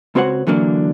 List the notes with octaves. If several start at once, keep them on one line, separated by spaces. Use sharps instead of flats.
C#2 C4 F#4 C5 C#5 F#5
D3 E3 F#3 A#3 D4